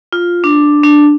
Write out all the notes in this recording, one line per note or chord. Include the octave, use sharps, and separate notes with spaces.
F4
D4
D4